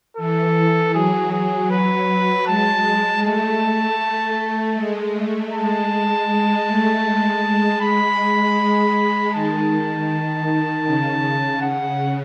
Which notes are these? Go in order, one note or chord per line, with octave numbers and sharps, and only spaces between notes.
E3 A4
F#3 G#4
G#4
B4
G#3 A5
A3 A5
G#3
A3
G#3 A5
G#3
A3
G#3
G#3
B5
D#3 A5
C#3
F#5